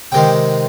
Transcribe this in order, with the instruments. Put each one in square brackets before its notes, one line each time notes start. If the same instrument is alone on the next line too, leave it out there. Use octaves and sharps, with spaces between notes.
[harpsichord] C3 D#3 G#3 G5